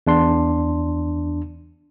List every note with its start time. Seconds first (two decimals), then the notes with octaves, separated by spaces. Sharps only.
0.07 E2 D4 C6